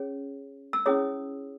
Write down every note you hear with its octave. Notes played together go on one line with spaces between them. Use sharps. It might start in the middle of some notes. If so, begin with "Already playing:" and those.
Already playing: C#4 G#4 C#5
E6
C#4 E4 G#4 C#5 D#6